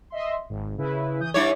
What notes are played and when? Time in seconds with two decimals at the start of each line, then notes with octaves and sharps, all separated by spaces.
0.10 D#5 E5 C6
0.50 G#1
0.78 C#3 E4 B4
1.20 E3 D#6 G6
1.34 G2 E4 C#5 D6 G#6 A6